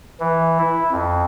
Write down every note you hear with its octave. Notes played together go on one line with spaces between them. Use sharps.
E3
E4
F2